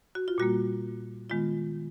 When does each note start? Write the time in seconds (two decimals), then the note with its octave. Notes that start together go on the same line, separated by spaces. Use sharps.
0.15 F#4
0.28 F4
0.38 A#2 G3 A#3 F#4
1.30 D#3 G#3 B3 F4